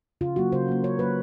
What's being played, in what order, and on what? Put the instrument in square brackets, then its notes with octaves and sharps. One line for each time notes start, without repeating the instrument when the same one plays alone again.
[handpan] C#3 F4
F#3 A#3 F#4
C#3 C5
F#3 A#3
C#3 C#5
F#3 A#3 B4